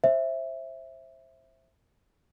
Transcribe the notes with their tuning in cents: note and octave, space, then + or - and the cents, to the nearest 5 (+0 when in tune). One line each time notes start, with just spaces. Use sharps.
C5 +25 E5 +0